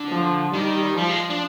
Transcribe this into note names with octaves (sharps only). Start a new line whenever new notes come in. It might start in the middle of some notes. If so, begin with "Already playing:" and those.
Already playing: D3
F3
D#3 G3
F3 G3
G#3
D4